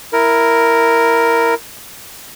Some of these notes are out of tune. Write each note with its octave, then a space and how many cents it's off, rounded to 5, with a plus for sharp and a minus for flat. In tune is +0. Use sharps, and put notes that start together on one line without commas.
E4 +0 A#4 +0